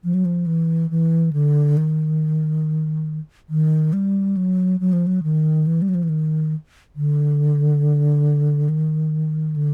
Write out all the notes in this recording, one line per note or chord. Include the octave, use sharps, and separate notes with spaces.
F3
F#3
F3
E3
E3
D3
D#3
D#3
G3
F#3
F#3
F3
F#3
D#3
E3
G3
F#3
F3
E3
D#3
D3
D#3
D3